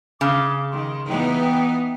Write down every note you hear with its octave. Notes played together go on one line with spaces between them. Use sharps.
C#3 D6
D#3 C6
E3 B3 D#4 G5